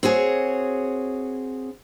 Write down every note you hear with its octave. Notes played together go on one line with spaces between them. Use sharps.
C4 F#4 G#4 C#5